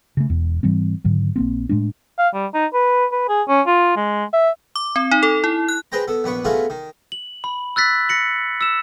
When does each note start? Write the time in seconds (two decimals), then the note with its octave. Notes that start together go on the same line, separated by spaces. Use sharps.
0.17 C#3 A3
0.30 E1 E2
0.63 G#2 E3 G3 C4
1.04 G#2 D3 D#3 F#3
1.36 A#1 A#3 C4
1.69 A2 G#3 A3 D4
2.19 F5
2.34 G3
2.54 D#4
2.74 B4
3.12 B4
3.29 G#4
3.48 C#4
3.67 F4
3.96 G#3
4.33 E5
4.76 D6
4.96 C4
5.11 D#4
5.23 A4
5.44 E4
5.68 F#6
5.92 G#4 B4 C5 G5 A#5
6.08 B3 A4
6.24 A#1 B3 B4 C#6
6.45 A3 B3 C#4 F4 F#4 G#4
6.70 D#3
7.12 F#7
7.44 B5
7.76 E6 F#6 A6 B6
8.09 A#6 C#7 F#7
8.61 E6 E7